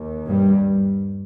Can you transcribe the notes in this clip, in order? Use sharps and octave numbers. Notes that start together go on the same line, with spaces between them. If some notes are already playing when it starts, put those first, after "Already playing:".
Already playing: D#2
G2 G3